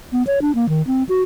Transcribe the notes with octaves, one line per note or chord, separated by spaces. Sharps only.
B3
C#5
D4
A#3
D#3
C4
F#4